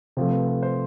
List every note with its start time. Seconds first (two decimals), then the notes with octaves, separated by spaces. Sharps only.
0.17 C3 F3 A3 C5
0.32 B4
0.47 B4
0.63 C5